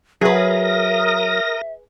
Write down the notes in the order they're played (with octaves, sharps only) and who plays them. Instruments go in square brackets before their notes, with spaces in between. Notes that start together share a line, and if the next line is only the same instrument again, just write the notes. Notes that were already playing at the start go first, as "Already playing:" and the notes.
[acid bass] F#3 [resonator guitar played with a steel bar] G#4 B4 [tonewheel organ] A#4 D#6 A#6 [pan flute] E5